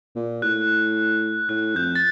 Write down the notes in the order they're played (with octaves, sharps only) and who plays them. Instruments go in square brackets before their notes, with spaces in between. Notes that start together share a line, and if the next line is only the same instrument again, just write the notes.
[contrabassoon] A#2
[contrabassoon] A2 [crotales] F#6
[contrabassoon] A2 [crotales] F#6
[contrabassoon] F2 [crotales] G6
[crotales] A6